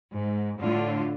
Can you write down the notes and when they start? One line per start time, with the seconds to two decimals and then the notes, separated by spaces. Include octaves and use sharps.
0.13 G#2
0.60 A2 D3 F4